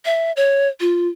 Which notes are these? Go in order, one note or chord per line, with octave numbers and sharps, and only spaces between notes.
E5
C#5
F4